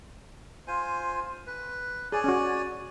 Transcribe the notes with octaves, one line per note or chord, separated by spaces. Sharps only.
F4 C5 G#5
B4
G#4 C#5 D5 G#5
C#4 F#4